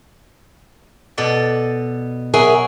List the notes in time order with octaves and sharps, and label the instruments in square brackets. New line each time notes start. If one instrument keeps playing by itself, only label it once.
[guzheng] B2 A4 D5
[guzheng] F#3 [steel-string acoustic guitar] G#4 A#4 E5